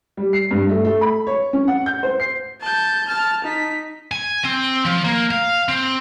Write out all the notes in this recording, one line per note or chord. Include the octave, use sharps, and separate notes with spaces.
G3
C7
G2
A3
A3
B5
C#5
C#4
F#5
G6
C5
C7
A5 G6
A5 F6
D#4 B6
G#5
C4
F3
A#3
F5
C4